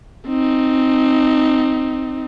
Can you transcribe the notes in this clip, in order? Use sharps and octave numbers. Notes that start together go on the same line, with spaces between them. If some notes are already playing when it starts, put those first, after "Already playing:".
C4 D#4